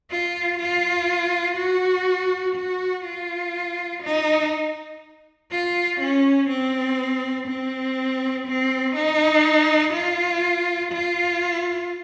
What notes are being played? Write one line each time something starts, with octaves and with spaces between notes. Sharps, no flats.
F4
F4
F#4
F#4
F4
D#4
F4
C#4
C4
C4
C4
D#4
F4
F4